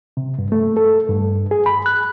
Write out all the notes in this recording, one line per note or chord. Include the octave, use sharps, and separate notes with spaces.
C3
G2
A3
A4
G2
G#4
B5
F#6